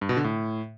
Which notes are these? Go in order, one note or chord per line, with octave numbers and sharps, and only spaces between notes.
G2
B2
D3
A2